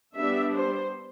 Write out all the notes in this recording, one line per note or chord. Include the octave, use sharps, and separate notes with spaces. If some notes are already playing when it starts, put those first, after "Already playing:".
G3 B3 D4 E5
C5